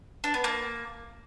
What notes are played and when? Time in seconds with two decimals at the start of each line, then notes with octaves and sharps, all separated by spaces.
0.24 D4
0.34 B3
0.44 A#3